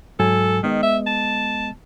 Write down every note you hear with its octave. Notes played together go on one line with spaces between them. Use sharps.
G#2 F#3 A4 G#5
D#3 G#3 B3 D#5
E5
A5